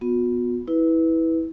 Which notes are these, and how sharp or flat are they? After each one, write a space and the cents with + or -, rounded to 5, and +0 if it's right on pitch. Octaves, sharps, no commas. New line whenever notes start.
B3 +0 F#4 -45
E4 -20 B4 +0